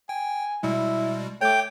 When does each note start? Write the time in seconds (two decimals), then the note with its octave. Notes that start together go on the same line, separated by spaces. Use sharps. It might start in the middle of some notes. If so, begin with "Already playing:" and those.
0.09 G5 G#5
0.63 B2 G3 G#3 E4
1.41 A3 C#5 G5 D6